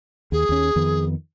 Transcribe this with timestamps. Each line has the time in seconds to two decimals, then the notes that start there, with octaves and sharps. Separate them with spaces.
0.32 D#2 G#4
0.49 D#2 C#4
0.76 F2 D#3 B3